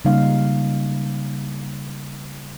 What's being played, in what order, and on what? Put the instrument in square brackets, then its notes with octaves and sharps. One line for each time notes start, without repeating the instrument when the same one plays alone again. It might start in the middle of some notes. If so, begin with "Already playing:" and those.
[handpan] C#3 G3 A#3 D#4 F5